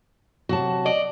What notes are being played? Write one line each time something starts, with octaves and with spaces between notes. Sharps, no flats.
C3 F#3 F#4 F#5 A5
D5 D#5